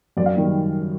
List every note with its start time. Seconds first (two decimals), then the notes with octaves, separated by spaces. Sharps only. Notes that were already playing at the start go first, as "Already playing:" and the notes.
0.17 F#2 D5
0.26 F5
0.36 D#3 G3